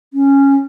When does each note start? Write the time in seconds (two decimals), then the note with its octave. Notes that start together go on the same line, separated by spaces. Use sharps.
0.14 C#4